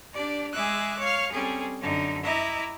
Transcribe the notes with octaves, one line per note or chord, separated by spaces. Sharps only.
D4 G4 D5
G#3 G#4 E5 D6 E6 F#6
C#5 F5 F6
G3 C4 C#4 G#4 A4
F#2 D3 D#4
E4 D#5 E5 A#5 D6